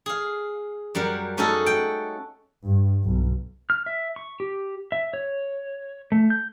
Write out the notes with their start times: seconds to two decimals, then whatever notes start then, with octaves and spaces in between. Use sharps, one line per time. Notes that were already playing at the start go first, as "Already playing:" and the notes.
0.06 G#4 F5
0.95 F#2 G3 A#4 F#5
1.37 A3 C#4 D#4 F#4 G#4 A4
1.66 F#5 G5
2.64 G2
3.03 B1
3.70 F6
3.86 E5
4.16 C#6
4.40 G4
4.92 E5
5.14 C#5
6.12 A3
6.30 G6